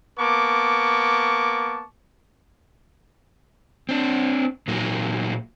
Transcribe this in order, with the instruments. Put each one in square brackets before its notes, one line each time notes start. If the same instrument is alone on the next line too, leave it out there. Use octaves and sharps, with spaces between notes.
[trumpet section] A#3 B3 A5 C#6 D6
[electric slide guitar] C4 D4
A#2 F#3 A#3 D#4 F#4 A#4